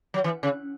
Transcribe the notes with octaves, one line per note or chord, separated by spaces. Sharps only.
F#3
E3
C#3